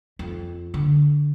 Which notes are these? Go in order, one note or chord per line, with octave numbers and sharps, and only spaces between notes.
F2
D3